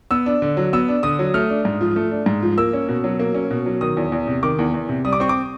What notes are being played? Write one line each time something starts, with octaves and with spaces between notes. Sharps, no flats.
B3 E6
D4
D3
F#3
B3 E6
D4
D3 D#6
F#3
A3 F6
D4
G#2
F3
A3
D4
G#2
F3
A#3 E6
C#4
B2
F#3
A#3
C#4
B2
F#3
D#3 D#6
E2
E2
C3
D#3 D6
E2
E2
C3
G3 D#6
D6
C4 C#6
D6